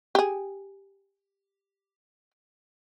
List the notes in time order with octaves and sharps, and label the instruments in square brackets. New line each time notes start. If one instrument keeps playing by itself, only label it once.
[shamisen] G4 G#4